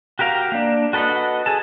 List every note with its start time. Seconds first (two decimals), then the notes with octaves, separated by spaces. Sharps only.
0.19 F#4 G4 A#4 F5
0.52 A#3 D4
0.93 F#4 A4 B4 D#5 F#5
1.46 G#4 A4 A5